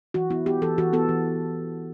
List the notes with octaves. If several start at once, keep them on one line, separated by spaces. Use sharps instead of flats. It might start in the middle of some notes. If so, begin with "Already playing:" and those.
E3 F#4
B3 E4
B3 G4
E3 A4
E3 F#4
B3 A4
E3